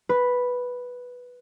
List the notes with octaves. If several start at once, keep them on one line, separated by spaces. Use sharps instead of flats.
B4